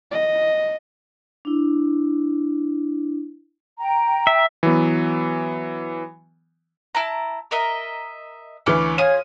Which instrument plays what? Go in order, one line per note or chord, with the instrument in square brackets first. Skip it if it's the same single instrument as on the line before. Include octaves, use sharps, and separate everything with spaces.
[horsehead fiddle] D#5
[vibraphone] D4 E4
[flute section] G5 A#5
[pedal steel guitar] E5
[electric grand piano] E3 F#3 B3
[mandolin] E4 A5 A#5
A#4 D#5 E5
[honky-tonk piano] D2 E3 B4 [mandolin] C#4 D6
[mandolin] F4 G#4 D#6 [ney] C#5 [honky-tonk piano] D#7